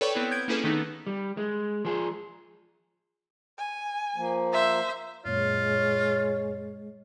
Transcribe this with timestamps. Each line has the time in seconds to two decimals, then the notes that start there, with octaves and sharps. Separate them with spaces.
0.01 A4 B4 C#5 D5 G5 C#6
0.15 B3 C4 E4
0.31 G6 G#6 D7
0.48 A#3 C#4 E4 G#4 A4 B4
0.64 D#3 A3 B3 D#4
1.07 G3
1.37 G#3
1.85 F3 G#4
3.58 G#5
4.16 F3 A#3
4.53 C5 E5
5.25 F#2 A#2 G#3 F4 C#5